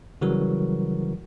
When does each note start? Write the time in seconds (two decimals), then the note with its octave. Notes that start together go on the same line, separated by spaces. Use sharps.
0.21 C#3 E3 F#3 G3 F#4 A#4